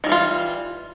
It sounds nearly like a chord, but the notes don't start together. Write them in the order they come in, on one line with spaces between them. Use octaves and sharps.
D#3 G3 E3 F4